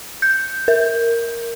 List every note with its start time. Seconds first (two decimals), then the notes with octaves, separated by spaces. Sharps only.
0.22 G6
0.68 A#4